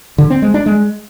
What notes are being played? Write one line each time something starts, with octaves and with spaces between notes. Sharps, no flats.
D3
C4
G#3
D4
G#3